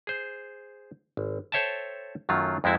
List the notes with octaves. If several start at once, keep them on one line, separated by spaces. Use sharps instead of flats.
G#4 C5
G#1
A4 C5 C#5 E5 G5 A5
F#2 D#3 F#3 A3 F4
F2 G#3 C4 E4 F#4 E5